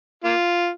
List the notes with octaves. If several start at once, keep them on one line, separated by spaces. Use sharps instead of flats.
A#3 F4